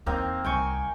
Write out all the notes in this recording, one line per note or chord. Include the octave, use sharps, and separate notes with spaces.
E2 A#3 C4 D#4
C2 G5 G#5 C#6